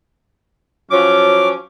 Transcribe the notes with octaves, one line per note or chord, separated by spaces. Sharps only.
F3 F#3 C#4 D6